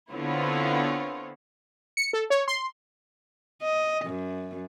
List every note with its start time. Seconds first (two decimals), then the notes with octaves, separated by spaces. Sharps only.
0.11 D3 B3 C4 E4 F4 C#5
1.97 C#7
2.13 A4
2.30 C#5
2.48 C6
3.62 D#5
4.06 F#2